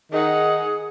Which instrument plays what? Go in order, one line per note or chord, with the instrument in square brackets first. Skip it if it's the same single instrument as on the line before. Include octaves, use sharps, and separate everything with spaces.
[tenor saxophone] D#3 [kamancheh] D#4 F#5 [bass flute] G#4